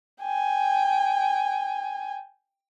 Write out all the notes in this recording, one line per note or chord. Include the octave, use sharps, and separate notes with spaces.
G5 G#5